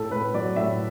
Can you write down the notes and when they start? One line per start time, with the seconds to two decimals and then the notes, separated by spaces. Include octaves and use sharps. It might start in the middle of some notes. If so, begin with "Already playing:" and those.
Already playing: A2 A4
0.10 A2 B4
0.34 F#3 D5
0.56 A2 E5